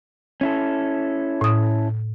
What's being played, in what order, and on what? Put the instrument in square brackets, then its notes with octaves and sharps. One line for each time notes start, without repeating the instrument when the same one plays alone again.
[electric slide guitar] C#4 E4 A4
[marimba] A2 D#6